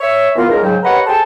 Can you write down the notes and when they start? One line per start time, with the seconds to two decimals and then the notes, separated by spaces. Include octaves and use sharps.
0.01 C#5 E5
0.36 E3 A#3 B3 F4
0.49 C#2 G#2 A#4
0.63 G#2 C#3 F#3 G5
0.83 G4 A#4 B4 C#5 D#5 F#5
1.06 G#4 A4 C5 G5 A5